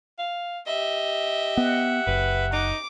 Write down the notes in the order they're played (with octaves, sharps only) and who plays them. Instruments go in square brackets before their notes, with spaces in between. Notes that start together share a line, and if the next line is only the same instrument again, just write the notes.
[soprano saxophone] F5
[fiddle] G4 E5 [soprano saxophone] D#5
[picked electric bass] B3 [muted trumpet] F#5
[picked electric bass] F#1 [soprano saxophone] B4
[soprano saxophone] D#4 [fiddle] D6